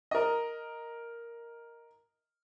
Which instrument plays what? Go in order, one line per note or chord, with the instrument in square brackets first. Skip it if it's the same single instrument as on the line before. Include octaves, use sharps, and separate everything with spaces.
[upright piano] A#4 D#5